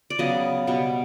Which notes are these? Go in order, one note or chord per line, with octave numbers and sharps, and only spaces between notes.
D5
C#3 F#3 B3 D#5
B2 G3 B3